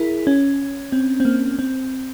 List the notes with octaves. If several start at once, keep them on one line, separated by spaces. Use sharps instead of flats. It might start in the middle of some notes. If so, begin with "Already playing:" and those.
Already playing: E4 G#4 A#4
C#4
C4
C4
A#3
C4